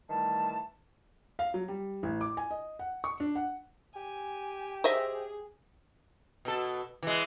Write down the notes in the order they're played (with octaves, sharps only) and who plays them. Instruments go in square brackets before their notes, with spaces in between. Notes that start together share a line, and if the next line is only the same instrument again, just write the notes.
[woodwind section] D#3 E3 G3 A3 A5
[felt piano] F5
F#3
G3
A1
D6
G#5
D#5
F#5
C#6
D4
F#5
[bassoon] G4 [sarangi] G#5
[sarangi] G#4 [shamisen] C5 D#5 E5
[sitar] B2 A4
E3 G#3